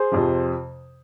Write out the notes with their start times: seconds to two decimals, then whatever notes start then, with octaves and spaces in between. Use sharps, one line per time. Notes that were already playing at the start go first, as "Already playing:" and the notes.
Already playing: G#4 C5
0.12 F2 C3 F3